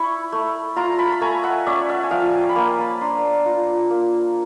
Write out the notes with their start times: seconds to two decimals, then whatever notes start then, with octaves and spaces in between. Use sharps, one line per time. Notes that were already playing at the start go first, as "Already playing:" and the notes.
Already playing: E4 B5 C#6
0.32 A3
0.76 F4 A#5 C6
0.99 A5 B5
1.12 B5
1.21 A3 G#5 A#5
1.44 E5 F#5
1.66 C#4 D5 E5
1.89 E5 F#5
2.03 G#5
2.11 F3 F5 G5
2.26 G#5
2.33 G5 A5
2.49 B5
2.56 A#3 G#5 A#5
2.79 A5 B5
3.01 D4 A#5 C6
3.46 F4
3.91 A#3